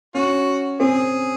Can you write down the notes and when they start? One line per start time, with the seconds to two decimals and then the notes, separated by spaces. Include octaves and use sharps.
0.15 C#4 F#4
0.80 C4 G#4